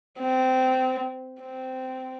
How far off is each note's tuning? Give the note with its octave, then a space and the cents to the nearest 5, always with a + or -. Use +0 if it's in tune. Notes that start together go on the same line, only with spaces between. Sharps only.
C4 -20
C4 -15